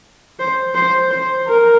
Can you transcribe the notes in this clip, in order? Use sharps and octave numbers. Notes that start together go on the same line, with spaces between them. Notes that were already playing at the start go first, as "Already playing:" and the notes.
C5
C5
C5
A#4